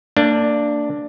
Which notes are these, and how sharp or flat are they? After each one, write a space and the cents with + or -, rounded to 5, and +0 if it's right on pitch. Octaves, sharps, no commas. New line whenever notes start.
A#3 -40 D4 +0